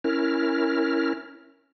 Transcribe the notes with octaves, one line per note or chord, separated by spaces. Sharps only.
C#4 E4 A#4 F6